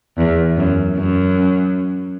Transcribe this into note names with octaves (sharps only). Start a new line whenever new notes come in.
E2
F#2
F#2